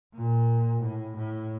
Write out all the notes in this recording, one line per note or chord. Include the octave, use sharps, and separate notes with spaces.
A#2
A2
A2